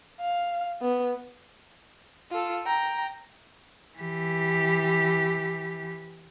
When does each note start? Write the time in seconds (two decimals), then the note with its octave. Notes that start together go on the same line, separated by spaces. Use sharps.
0.21 F5
0.81 B3
2.31 F4 A4
2.66 G5 A#5
3.98 E3 G4